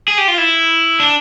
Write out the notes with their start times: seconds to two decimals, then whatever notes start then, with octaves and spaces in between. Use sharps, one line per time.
0.08 G#4
0.18 G4
0.28 F4
0.38 E4
1.00 D4